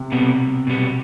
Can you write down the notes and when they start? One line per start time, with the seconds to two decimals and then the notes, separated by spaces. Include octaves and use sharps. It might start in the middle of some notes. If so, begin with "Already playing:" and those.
Already playing: C3
0.12 B2 G3 B3
0.67 B2 G3 B3